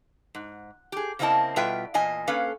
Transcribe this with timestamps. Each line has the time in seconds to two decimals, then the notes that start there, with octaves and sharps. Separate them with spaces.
0.35 G#2
0.92 G4 G#4
1.19 C#3 A#3 C4 E4 D#5 A5
1.56 B2 G3 F4 B4 E5 G5
1.94 E2 A#2 D#5 G#5
2.28 A#3 C#4 A4 B4 F5